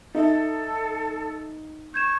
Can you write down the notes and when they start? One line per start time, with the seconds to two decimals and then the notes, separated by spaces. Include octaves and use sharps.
0.15 D#4 A4 D#5 E5
1.94 C#6 G6 G#6 E7